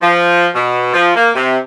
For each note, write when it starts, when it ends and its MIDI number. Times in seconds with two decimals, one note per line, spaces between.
0.01 0.47 53
0.54 0.90 47
0.94 1.13 53
1.15 1.30 58
1.35 1.57 48